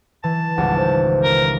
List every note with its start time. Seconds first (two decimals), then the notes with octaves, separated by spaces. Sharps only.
0.24 E3 A5
0.57 G#1 C#2 G3 F#5
0.78 C5
1.23 A#4